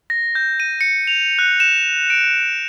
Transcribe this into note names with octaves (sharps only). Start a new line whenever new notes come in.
A#6
G6
D#7
C#7
F7
F#6
E7
D7